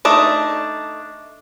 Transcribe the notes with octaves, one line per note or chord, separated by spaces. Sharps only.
A3 D4 D#4